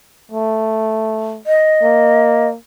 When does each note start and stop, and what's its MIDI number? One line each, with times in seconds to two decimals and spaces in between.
0.31 1.42 57
1.46 2.48 75
1.83 2.57 58